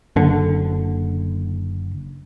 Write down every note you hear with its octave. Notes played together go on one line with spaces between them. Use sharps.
F#1 D3